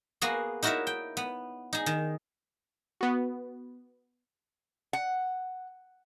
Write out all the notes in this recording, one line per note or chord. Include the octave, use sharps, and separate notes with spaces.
A#3 B3 F#4 G#4
D#4 E4 F#4 A#4 C#5 E5
G5
B3
D#4 G#4
D#3
B3 F#4
F#5